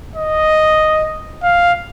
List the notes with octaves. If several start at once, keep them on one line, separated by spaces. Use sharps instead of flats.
D#5
F5